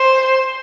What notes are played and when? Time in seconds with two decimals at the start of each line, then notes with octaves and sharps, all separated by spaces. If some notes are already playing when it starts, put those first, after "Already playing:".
Already playing: C5